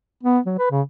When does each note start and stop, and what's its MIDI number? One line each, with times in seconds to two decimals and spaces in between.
0.24 0.39 59
0.46 0.56 54
0.58 0.70 71
0.71 0.81 49